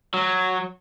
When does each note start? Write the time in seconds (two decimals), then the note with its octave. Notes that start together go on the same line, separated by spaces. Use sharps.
0.14 F#3